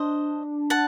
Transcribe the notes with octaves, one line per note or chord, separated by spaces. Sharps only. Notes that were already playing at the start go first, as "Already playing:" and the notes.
Already playing: D4 C5 D#5
F#5 A5